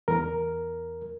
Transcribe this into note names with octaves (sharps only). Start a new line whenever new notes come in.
E2 A#4